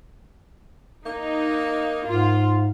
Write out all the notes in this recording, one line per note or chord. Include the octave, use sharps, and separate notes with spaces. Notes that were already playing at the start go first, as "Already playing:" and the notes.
A#3 D#4
G#2 F4